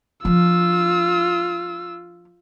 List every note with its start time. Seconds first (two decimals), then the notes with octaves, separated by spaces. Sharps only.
0.25 F3 D4 F4 E6